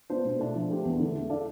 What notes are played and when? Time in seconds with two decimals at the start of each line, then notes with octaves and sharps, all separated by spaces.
0.10 B3 D4 F4 C5
0.25 B2
0.39 A3 D4
0.55 F3
0.70 A3 D4 G4
0.85 E2
1.00 D3 A3
1.15 A3
1.30 D4 A4 D5 F5